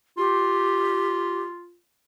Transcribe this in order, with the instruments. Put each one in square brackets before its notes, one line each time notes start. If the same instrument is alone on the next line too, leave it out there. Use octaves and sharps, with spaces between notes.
[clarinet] F4 [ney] G4